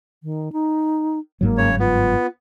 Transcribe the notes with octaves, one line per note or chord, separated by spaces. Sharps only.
D#3
D#4
G1 G#2 F#3 A#3
C#3 C#5
B3 F4